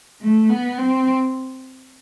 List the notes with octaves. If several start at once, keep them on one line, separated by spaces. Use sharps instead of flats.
A3
B3
C4